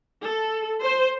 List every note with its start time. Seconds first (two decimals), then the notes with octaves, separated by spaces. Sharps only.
0.25 A4
0.83 C5